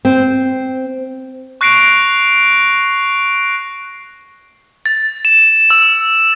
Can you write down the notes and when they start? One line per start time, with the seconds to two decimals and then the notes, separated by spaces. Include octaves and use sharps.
0.05 C4
1.61 C#6 F#6 A#6 C7 D7 F7
4.86 A6
5.25 E7
5.70 E6